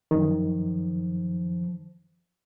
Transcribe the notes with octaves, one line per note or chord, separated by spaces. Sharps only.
F#2 D#3 F3